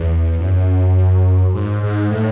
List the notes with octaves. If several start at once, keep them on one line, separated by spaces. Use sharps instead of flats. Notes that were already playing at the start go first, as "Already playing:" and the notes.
Already playing: E2
F#2
G#2
G#2
A2